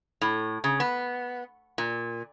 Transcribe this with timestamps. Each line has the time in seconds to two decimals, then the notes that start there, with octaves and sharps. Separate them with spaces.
0.21 A2
0.64 C#3
0.80 B3
1.78 A#2